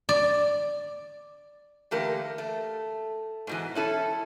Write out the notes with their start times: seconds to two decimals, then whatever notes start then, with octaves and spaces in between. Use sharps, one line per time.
0.09 D5
1.91 D3 E3 A3 A#3 G4 A#4
2.38 A3
3.47 G#2 B2 E3
3.75 C#4 E4 A4